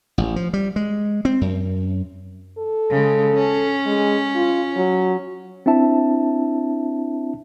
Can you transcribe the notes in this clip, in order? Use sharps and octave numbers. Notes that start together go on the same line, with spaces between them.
A1
F3
G3
G#3
C4
F#2
A4
C#3 G#3
C#4
G#3
F4
F#3
C4 D4 E4 E5 A5